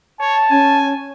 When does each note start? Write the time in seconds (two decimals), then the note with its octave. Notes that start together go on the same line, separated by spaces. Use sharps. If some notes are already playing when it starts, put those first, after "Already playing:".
0.20 C#5 A5
0.50 C#4 G#5